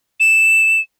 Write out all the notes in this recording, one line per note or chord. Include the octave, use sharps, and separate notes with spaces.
E7